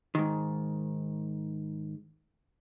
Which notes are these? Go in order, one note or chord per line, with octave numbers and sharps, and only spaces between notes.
G#2 D#3